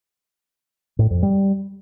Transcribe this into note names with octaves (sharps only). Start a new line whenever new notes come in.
A2
F2
G3